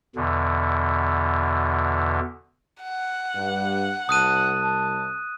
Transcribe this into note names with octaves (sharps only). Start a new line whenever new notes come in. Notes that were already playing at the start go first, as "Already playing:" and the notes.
E2 B2 D3
F#5
G2
C2 A5 D#6 F#6 D#7